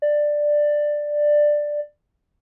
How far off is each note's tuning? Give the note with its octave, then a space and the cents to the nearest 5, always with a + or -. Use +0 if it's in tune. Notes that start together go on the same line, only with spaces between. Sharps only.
D5 +10